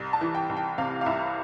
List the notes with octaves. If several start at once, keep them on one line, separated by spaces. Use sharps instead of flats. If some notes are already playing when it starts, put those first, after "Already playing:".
Already playing: C2
A5
E3
G5
C2
G5
C3 F5
F5
C2 E5